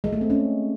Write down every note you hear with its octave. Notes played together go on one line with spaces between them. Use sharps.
G#3
A3
C4
C#4